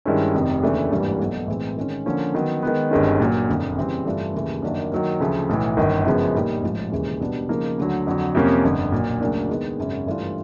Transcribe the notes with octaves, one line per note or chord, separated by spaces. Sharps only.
G2 D#3 G#3 C#4 E4
F1 F2 C3 D#3
D#2 C#3 E3 A3 D4
G#1 G2 E3 G3 A#3
B1 B2 F#3 A3
A2 E3 G#3 C4
D#3 G#3 C#4
D3 F3 A#3 C#4
D#3 F#3 B3
D#3 G#3 B3
G1 G2 D#3 G#3 C#4
A#2 F#3 A#3
F#1 F2 D3
C#3 E3 G3 C4
G2 E3 A3 D4 F4
D#2 C#3 E3 A3
F#2 D#3 F#3 A#3 D4
D#3 F#3 A#3
D2 C#3 F3 A3
B1 A2 E3
G1 F#2 D#3
F#2 C#3 F3 G#3 B3
A#2 G3 A#3 D#4 G4
A1 G#2 F3
E1 D#2 C#3 E3 G#3
B2 G3 B3 D4
C#3 F3 A#3 D#4
D2 D3 F#3
F2 D3 F#3
F2 C3 F3 A#3 C#4
G1 F2 D3
B1 A#2 F#3
D2 C#3 F#3 A#3 D4
D#3 G#3 B3 D#4
G#1 F#2 C#3
G2 E3 A3 D4 F4